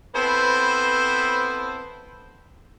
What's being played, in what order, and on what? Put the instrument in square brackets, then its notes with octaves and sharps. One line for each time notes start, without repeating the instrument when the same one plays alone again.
[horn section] B3 C4 E4 A4 B4 C5